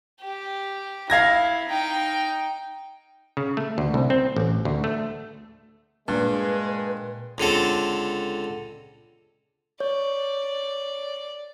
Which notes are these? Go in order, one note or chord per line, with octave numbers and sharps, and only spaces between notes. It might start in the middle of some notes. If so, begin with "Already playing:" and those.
G4
E4 F5 G#6 A#6
D#4 G5
C#3
A3
D2
C2
C4
A1
D2
A3
G2 A#2 G#3 B4
C#2 D3 C4 A4
C#5 D5